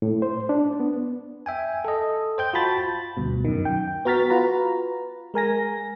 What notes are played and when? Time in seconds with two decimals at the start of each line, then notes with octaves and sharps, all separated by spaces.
0.02 A2
0.22 C5
0.49 D4
0.80 B3
1.46 E5 G5 G#5
1.85 A4 D#5
2.38 C5 G5 G6
2.53 F4 F#4 A5 B5 A6
3.17 D2 G2 B2
3.45 F#2 D#3
3.65 G5
4.05 B3 F#4 A#5 F6 A6 B6
4.30 F4 F#4 B4 A#5
5.34 G#3 A#4 G#5 A#6